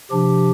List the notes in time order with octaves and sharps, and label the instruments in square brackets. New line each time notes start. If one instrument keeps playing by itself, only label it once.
[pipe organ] C3 F3 D4 G4